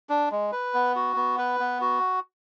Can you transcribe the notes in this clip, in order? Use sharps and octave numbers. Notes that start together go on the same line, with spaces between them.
D4
G#3
B4
B3
F#4
B3
B4
B3
F#4